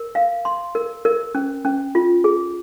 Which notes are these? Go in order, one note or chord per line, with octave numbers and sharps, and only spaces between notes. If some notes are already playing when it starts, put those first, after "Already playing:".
Already playing: A#4
F5
C6
A#4
A#4
C#4
C#4
F4
G#4